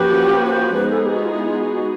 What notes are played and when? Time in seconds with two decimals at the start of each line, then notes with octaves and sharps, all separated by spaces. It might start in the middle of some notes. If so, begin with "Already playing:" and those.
Already playing: F3 A#3 C#4 F#4 G4 B4
0.47 C5
0.75 G#3 B3 D#4 G#4 B4
0.90 A4
1.03 G4
1.13 F#4
1.23 F4
1.32 E4
1.46 F4
1.60 F#4
1.74 F#4